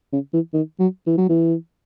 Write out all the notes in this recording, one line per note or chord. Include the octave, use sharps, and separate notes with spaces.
C#3
E3
D#3
F#3
E3
F#3
E3